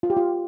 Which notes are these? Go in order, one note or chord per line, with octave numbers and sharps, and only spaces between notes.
F4
G4
F4